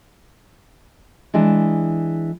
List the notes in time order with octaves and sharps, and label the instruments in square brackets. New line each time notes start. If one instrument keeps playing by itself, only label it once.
[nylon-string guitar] E3 G#3 D4